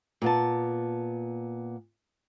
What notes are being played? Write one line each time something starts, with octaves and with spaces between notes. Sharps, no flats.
A#2 B3 A5